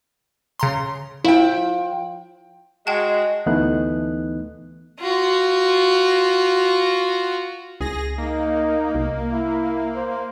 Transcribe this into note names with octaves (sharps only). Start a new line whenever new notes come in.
C#3 A#5 C6
F3 E4 G5
G#3 F#4 D#5 G5 A5
D2 E3 A3 B3 D#4 F#6
F4 F#4
C#2 G#4 A#6
A#3 D#4
C2
E4
C5